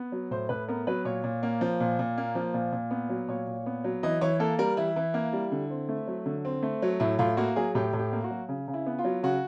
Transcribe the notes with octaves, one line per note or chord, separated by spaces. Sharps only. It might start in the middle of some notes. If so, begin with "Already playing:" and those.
Already playing: B3
F#3
A2 C5
A2 B4
B3 A#4
F#3 B4
A#2 C#5
A#2
A#3
F3
A#2
A#2
A#3
F3
A#2
A#2
B3
F#3
A#2 C#5
A#2
B3
F#3
E3 D#5
E3 C#5
A#3 A4
G3 A#4
E3 E4
E3
A#3
G3
D3
C4
A3
F#3
D3
C4
A3
F#3
A2 E4
A2 F4
A#3 F#4
F#3 G#4
A2 G4
A2
G4
A#3
F#4
F#3
C#3
C#3
E4
B3
F4
F#3
C#3 F#4